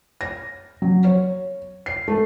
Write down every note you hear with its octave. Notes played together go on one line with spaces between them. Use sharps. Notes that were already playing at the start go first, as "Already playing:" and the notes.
A#6
F#3
C#5
C7
A3